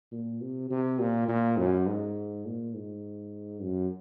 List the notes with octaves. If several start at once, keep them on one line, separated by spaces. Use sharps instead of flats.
A#2
C3
C3
A#2
A#2
F#2
G#2
A#2
G#2
F#2